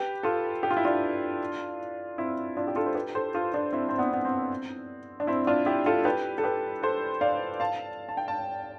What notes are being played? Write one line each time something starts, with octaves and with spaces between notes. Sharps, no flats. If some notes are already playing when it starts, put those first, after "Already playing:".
Already playing: G4 B4
F4 A4
G4
F4
E4
D4 F4
C4 E4
D4 F4
G4
F4 A4
C5
G4 B4
A4 C5
F4 A4
D4 F4
C4 E4
C4
B3 D4
B3
C4
D4
C4 E4
D4 F4
E4 G4
F4 A4
G4 B4
A4
G4 B4
A4 C5
D5 F5
F5 A5
A5
G5
F5 A5